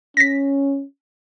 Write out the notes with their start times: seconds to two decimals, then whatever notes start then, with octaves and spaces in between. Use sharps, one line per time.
0.17 C#4 A#6 B6